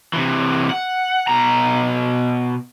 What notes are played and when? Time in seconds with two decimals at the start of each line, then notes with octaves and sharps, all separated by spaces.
0.13 C3 E3
0.70 F#5
1.28 B2 A#5